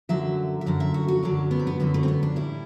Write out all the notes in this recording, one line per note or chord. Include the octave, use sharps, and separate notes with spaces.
F#2 D3 F#3 E5
E5
F#2 D3 F#3 F#5
E5
F#4
F#4
F#2 D3 F#3 D4
B3
C4
B3
F#2 D3 F#3 B3
A3
C4
B3
D4
A2 G3 E4